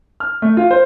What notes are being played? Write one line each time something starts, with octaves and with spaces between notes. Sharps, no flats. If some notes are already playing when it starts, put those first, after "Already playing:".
F6
A3
F4
C5